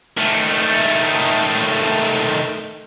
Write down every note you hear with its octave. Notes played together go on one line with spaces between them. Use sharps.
D#3 A3